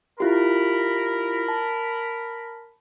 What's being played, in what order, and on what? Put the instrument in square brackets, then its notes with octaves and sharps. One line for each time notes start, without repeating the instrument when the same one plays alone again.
[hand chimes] E4 F4 G4 [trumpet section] A#4 B5
[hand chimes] A5